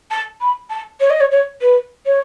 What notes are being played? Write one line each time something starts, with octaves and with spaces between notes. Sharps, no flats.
A5
B5
A5
C#5
D#5
C#5
C#5
B4
C#5